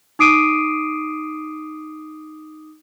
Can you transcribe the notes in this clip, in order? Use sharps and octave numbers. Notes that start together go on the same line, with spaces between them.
D#4 D6 D#6 C7 D7 D#7